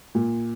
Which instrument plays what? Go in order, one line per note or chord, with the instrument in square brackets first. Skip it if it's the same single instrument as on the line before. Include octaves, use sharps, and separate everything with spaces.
[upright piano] A#2